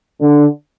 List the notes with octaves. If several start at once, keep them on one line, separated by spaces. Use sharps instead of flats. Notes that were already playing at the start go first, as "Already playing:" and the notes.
D3